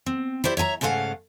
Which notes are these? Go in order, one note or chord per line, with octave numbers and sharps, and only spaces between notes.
C4
E4 G4 C5 D5
C#5 E5 G#5 A#5
G#2 C#3 A3 B4 F5 F#5